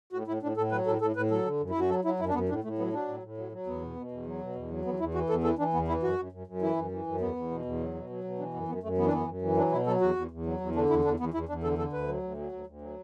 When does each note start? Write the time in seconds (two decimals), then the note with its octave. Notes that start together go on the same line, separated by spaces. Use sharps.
0.13 A2 F#4
0.27 A2 E4
0.42 A2 D4
0.57 A2 A4
0.72 F#3 B4
0.86 A2 A4
1.01 A2 A4
1.16 A2 B4
1.31 F#3 A4
1.46 D3
1.61 F#2
1.70 E4
1.75 F#2 F#4
1.90 F#3 A4
2.05 F#3 E4
2.19 F#2 E4
2.29 D4
2.34 F#2 B3
2.49 A2 D4
2.64 A2 A3
2.78 F#3 B3
2.93 F#3 D4
3.08 A2
3.23 A2
3.37 F#3
3.52 F#3
3.66 E2 B3
3.82 B2
3.96 B2
4.11 E2
4.26 F#3
4.41 B2
4.55 E2
4.70 F#3
4.85 E2 B3
4.99 E2 E4
5.14 E3 F#4
5.29 E2 A4
5.44 E3 A4
5.59 E3 D4
5.73 E2 B3
5.88 E3 E4
6.03 F#2 F#4
6.18 F#2
6.32 F#2
6.47 F#2
6.62 E3 E4
6.76 F#2
6.91 E3
7.06 F#2
7.21 E2 B3
7.36 E2
7.51 B2
7.65 E2
7.80 F#3
7.94 B2
8.10 F#3
8.24 B2
8.39 E3 D4
8.54 F#2 B3
8.68 F#2 B3
8.83 F#2 A3
8.98 E3 B3
9.06 D4
9.13 F#2 B3
9.28 F#2
9.42 E3
9.57 F#3 D4
9.71 B2 E4
9.86 F#3 A4
10.01 E2 F#4
10.16 E2
10.31 E2
10.46 F#3
10.60 E2
10.75 D3 D4
10.90 E2 E4
11.05 E2 D4
11.20 E2 B3
11.34 E2 E4
11.49 E2 D4
11.63 D3 A4
11.78 D3 A4
11.93 D2 B4
12.08 F#3
12.23 D2
12.37 F#3
12.52 D2
12.67 D2
12.81 F#3